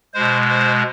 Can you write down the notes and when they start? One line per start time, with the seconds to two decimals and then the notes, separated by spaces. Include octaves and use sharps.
0.14 B2 G#3 C5
0.49 C5